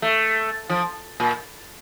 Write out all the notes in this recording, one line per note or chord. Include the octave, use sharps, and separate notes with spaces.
A3
F3
A#2